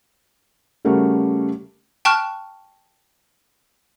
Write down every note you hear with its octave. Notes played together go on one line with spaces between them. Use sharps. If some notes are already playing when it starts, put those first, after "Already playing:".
C#3 G3 A3 F#4 A#4
G5 A5 C#6 F6 F#6